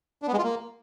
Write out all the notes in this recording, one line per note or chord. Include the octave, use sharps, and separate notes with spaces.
D4
B3
G#3
F4
A#3